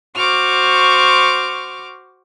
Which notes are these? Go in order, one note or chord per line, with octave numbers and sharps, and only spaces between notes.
F#4 C5 C#6 D6 F6